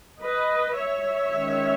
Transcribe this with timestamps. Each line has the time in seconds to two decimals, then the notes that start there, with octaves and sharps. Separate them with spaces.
0.22 B4 D#5
0.76 C#5 E5
1.31 D#3 G#3 C#4